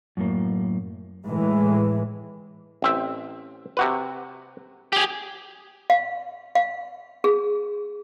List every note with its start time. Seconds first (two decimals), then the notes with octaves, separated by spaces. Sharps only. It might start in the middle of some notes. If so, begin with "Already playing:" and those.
0.17 F#2 A2 A#3
1.26 A2 E3 G#3
2.82 A1 C4 E5
3.77 C3 F#4 B4
4.93 G4 G#4
5.90 F5
6.55 F5
7.24 G#4